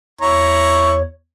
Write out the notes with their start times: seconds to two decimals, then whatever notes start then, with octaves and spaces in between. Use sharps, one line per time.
0.21 E2 E4 C#5 A#5 C#6